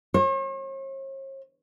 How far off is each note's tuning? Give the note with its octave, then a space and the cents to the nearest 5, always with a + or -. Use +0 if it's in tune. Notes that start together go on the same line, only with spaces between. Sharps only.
C#5 -45